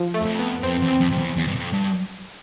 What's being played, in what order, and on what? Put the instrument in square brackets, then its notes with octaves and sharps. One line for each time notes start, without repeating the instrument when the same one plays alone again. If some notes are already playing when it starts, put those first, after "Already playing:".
Already playing: [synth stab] F3
A3
[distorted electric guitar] E2
F2
[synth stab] B3
[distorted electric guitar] F2 [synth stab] C4
[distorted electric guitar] E2
[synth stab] C4
[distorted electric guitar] F2
F2
E2
E2
G2
F2
G2